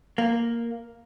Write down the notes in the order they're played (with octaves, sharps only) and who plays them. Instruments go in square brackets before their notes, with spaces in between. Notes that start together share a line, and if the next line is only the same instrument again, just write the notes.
[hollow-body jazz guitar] A#3